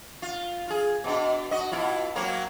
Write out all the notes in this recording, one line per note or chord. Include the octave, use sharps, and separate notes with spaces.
F4
F4 G#4
B2 D4
F#4 D#5
B2 E4 F4
F#3 A#3 C4